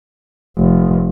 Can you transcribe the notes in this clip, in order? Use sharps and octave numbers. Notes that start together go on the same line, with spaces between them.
F1